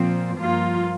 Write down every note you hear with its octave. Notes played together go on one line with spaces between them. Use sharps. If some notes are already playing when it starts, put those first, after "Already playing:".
Already playing: A#2 F3 C4
G2 F3 A#3 F4